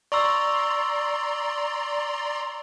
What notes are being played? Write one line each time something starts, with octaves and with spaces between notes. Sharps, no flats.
D5 A#5 C6 C#6 E6